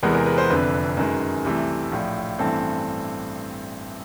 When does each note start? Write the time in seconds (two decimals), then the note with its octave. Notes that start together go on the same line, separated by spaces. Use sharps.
0.03 E2 C3 E3 G#3 B3 A#4
0.14 A#4
0.26 B4
0.38 C5
0.50 F1 F2 D3 B4
0.97 F#2 D#3 G#3
1.44 C2 C3 E3 A3
1.92 A#1 A2 F3
2.39 A1 G2 E3 A3 C4 A4